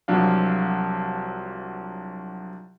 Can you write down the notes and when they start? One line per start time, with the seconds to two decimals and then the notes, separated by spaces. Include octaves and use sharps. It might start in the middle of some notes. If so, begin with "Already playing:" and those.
0.08 C2 F3 F#3 D4 F5